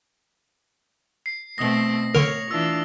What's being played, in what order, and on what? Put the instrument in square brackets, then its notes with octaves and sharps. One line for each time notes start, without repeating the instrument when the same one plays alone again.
[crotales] C7
[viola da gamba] B2 A3 C4 [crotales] D#6 A#6
[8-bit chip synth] D3 A#4 [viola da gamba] C#5 [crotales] F7
[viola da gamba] E3 D4 F4 [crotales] E6